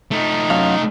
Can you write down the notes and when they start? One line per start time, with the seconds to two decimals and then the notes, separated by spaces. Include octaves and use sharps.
0.11 A3 D#4
0.50 F#2 F#3 F5